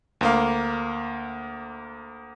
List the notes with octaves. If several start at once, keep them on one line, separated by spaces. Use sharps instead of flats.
D2 A#3 F5